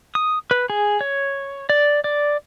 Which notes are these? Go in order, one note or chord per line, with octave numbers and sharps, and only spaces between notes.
D#6
B4
G#4
C#5
D5
D5